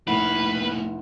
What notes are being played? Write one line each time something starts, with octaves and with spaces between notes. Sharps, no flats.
F1 A2 A#3 E4 B4 F#5